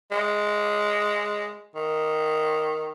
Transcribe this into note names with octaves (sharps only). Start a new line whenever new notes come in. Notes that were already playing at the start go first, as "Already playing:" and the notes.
G#3
D#3